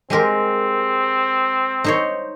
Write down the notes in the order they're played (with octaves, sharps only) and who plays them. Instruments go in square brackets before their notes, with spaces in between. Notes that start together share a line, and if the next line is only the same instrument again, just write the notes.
[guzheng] G#3 G4 A#4 [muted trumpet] C4
[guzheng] D#4 C5 C#5